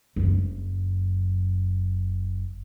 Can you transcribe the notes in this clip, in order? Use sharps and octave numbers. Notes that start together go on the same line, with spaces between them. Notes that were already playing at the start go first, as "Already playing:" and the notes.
F#1 F#2